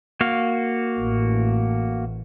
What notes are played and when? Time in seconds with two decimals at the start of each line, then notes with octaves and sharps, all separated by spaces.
0.21 A#3 F#4 F5
0.99 A1